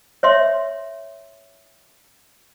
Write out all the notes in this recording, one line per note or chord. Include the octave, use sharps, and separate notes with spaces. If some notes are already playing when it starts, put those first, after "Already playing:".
C#5 E5 C6